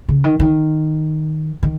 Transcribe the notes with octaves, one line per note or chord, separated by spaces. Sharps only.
C#3
D#3
D#3
D#3